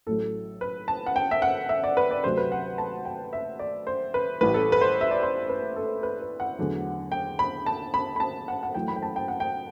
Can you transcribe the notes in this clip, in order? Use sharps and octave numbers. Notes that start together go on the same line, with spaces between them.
A1 A2 F#3 A4
B4
A5
F#5
G5
E5
F#5
E5
D5
B4
D5
D2 C3 F#3 A3 C5
B4
F#5
A5
G5
E5
D5
C5
B4
A1 A2 E3 G3 B4
A4
B4
C5
E5
D5
C5
B4
A4
B4
B4
F#5
E2 D3 F#3 A3
G5
B5
A5
B5
B5
A5
F#5
F#5
F#2 E3 A3 G5
B5
G5
A5
G5
F#5
G5